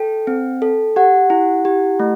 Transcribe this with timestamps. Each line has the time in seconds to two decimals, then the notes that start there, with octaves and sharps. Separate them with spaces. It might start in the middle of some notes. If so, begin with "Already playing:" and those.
Already playing: A4 G5
0.27 C4
0.62 A4
0.96 G4 F#5
1.30 E4
1.65 G4
2.00 A3